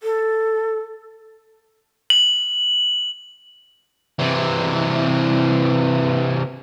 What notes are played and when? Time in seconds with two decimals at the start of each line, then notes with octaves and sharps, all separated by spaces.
0.03 A4
2.10 F#7
4.19 C3 E3